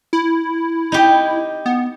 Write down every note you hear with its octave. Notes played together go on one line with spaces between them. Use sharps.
E4
D#4 G4
B3